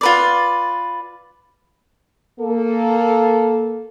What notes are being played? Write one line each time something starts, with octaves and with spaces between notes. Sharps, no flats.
F4 B4 D5
A#3 A4